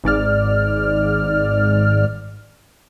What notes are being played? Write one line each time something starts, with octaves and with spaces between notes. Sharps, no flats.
G#1 G#2 D5 F6